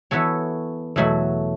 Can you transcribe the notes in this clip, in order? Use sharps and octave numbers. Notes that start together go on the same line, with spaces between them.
E3 B3 F#4 A4 C#5
E2 B2 F#3 A3 F#4